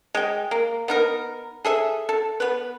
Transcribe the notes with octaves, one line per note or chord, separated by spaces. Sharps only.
G#3 G5
A#3
B3 D#4 A#4
G#4 A4 E5
A4
B3 B4